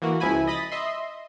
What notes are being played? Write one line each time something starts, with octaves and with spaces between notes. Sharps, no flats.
E3 A#3 F#4
C#2 F3 E4 G#5 B5
D#5 B5 D#6 A6
D#5 E5 C6